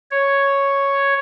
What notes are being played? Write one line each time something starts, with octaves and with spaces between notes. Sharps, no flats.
C#5